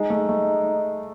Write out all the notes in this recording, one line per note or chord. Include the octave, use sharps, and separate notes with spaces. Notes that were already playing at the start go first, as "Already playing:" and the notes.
Already playing: G#3 D#4
A3
A3